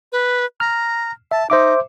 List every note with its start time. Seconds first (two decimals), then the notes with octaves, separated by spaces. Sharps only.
0.12 B4
0.60 A#5 F6
1.31 E5 A5
1.50 D#4 C5 E5 D6